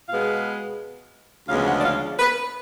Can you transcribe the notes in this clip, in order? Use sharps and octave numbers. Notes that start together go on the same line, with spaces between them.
B2 G#3 B3 F5
D2 C#3 F3 G#3 B3 F5
F#5
D5
F5
B4